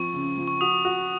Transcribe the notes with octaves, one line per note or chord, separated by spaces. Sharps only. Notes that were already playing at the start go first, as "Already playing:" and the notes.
Already playing: F3 C4 C#6
C#3
F3
C#6
F#4 D#6
F#4